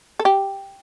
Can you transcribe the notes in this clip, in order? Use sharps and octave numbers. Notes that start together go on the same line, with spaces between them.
A4
G4